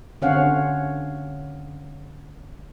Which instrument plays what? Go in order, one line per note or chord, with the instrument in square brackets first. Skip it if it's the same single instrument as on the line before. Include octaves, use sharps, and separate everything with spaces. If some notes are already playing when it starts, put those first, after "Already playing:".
[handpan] D3 C4 C#4 C#5 F5 F#5